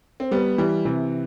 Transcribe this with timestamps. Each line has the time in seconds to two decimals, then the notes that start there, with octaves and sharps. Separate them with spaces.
0.20 C4
0.31 G3 B3
0.58 E3 G3
0.85 C3 E3